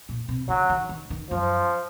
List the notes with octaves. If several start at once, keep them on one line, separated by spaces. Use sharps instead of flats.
A#2
C3
C#3 F#3
D#3
D#3
D#3
F#2 F3